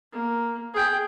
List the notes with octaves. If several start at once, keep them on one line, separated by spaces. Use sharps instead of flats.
A#3
G#4 G5